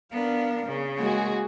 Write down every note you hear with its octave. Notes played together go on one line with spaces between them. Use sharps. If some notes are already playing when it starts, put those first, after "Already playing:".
B3 D4 A#4 F5
C#3
G#3 A#3 F#4 G#4